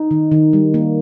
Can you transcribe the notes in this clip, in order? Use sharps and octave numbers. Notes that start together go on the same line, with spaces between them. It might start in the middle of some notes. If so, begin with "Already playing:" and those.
Already playing: D#4
D#3
D#3
G3
A#3